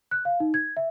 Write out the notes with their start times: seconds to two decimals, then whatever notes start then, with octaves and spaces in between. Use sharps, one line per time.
0.11 F#6
0.25 F5
0.40 D#4
0.54 G#6
0.77 E5